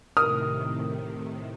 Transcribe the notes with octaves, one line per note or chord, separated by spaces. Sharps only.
A2 C3 D#3 A#4 D#6 F6